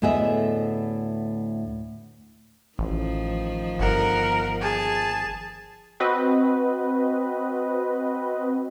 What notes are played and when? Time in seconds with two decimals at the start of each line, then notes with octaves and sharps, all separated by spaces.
0.02 D2 A2 B3 G#4 D#5 E5
2.79 A1 D#3 F3
3.79 G1 A#4 F#5
4.61 G#4 A5
6.00 C4 F#4 B4 D#5